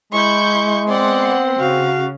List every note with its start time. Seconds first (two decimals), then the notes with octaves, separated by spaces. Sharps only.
0.12 G#3 E4 C#6 G6
0.89 B3 C4 D5 F#5 C6
1.59 C#3 F#4 F5